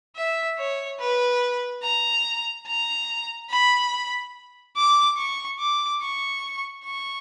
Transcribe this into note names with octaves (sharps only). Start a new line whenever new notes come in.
E5
C#5
B4
A#5
A#5
B5
D6
C#6
D6
C#6
C#6